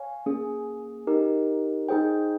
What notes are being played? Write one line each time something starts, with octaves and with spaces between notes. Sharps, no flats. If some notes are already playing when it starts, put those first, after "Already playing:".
Already playing: C#5 F5 G#5
A#3 C#4 G#4
D#4 G4 A#4
D#4 G#4 C5 G5